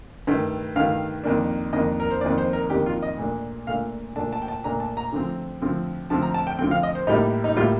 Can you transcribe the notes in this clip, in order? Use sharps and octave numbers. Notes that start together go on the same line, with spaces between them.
G2 D#3 A3
G2 D#3 A3 F5
F2 D#3 A#3 D4
F2 D#3 A#3 D4 D#5
A#4
C5
F2 D#3 A#3 D4 D5
C5
A#4
F2 D#3 A#3 D4 G4
F4
D#5
A#2 A3 D4
A#2 A3 D4 F5
A#2 A3 D4 A5
A5
G5
A5
A#2 A3 D4 A#5
A5
A#5
D3 F3 A3 C4
D3 F3 A3 C4
D3 F3 A3 C4 A5
A#5
A5
G5
D3 F3 A3 C4 G5
F5
D#5
C5
A2 G3 A#3 D#4
D#4
A2 G3 A#3 F4